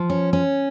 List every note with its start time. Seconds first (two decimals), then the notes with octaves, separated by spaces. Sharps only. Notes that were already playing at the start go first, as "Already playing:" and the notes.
Already playing: F3
0.10 C#4
0.33 C#4